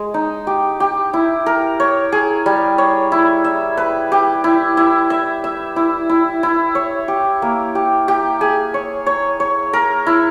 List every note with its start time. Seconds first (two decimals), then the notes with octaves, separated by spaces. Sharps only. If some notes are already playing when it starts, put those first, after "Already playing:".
Already playing: G#3
0.14 D#4
0.47 G4
0.80 G4
1.13 E4
1.46 A#4
1.80 C#5
2.12 G#4
2.46 G3
2.78 C#5
3.12 E4
3.44 E5
3.77 B4
4.12 G4
4.44 E4
4.77 E4
5.10 E5
5.44 E5
5.76 E4
6.09 E4
6.43 E4
6.75 C#5
7.08 G4
7.42 A#3
7.75 G4
8.08 G4
8.41 G#4
8.74 C#5
9.06 C#5
9.40 C#5
9.73 A#4
10.07 E4